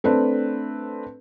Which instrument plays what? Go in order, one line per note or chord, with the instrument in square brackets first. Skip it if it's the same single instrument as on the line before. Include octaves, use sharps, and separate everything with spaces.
[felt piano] A3 C4 D4 B4